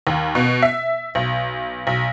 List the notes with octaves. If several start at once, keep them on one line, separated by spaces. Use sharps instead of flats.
D#2
B2
E5
B1
B1